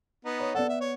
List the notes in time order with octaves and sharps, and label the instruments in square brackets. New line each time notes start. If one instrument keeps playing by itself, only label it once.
[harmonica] B3 D#4
[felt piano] C#5
[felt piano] B3 D5 F#5 [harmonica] A4
[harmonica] E5
C#5